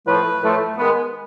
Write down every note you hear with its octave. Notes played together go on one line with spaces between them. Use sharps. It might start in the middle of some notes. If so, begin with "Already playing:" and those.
A2 F3 A3 B4
A2 F3 A3
D#3 G#3 B3